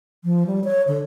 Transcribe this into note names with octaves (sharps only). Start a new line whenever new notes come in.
F3
G3
C#5
D3